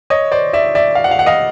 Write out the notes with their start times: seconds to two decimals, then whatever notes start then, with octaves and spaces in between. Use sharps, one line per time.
0.10 C#5 D#5
0.32 C5 D5
0.53 D5 E5
0.75 D5 E5
0.95 F5
1.04 F#5
1.11 F5
1.19 F#5
1.26 D#5 F5